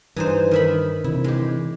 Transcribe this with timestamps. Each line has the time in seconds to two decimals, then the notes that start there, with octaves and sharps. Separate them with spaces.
0.16 G2 E3 D#4 C5
0.51 D#3 E5 B5
1.04 C3 E3 E4
1.24 G#3 G4